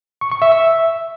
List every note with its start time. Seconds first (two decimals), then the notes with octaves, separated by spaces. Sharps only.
0.21 C#6
0.32 C#6
0.42 E5
0.52 E5